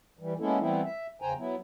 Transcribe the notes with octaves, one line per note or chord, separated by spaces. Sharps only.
E3 G3
G#3 A#3 B3 C#4 E4 A4
E3 G3 A3 B3 C4 E4
E5
E2 C#3 C5 G5 G#5 A#5
F#3 B3 E4